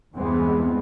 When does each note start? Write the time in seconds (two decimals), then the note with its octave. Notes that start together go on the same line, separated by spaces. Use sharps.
0.16 E2 G2 E3 G#3 B3 C4